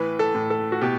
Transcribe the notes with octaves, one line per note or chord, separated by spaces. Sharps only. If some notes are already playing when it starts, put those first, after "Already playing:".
Already playing: A2 E3 B4
A4
A2
A4
F#4
B2 G4